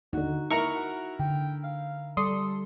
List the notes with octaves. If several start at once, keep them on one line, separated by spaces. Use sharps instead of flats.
D#2 D3 D#4 F#4
A#3 E4 A#4 A#5 C#6 F6
F#4
D3 G5
F5
G3 A4 D5 C6 D#6